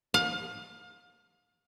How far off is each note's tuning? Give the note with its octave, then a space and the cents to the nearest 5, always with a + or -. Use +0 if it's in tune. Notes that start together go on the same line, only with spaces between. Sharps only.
F5 +30